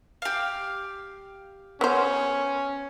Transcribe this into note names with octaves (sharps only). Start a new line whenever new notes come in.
G4 F5
B3 C#4 C5